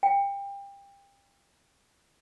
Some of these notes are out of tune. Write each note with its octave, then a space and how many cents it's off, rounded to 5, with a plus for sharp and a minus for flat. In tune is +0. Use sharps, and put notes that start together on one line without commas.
G5 +25